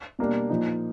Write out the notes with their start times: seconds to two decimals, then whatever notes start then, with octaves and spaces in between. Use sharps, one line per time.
0.19 B2 G3 A#3 D4
0.50 A#2 F3 A#3 D#4